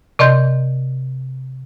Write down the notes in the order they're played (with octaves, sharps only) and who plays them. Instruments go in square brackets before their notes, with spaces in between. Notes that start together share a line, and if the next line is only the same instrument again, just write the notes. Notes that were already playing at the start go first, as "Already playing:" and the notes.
[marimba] C3 D5 D#5 C6 G6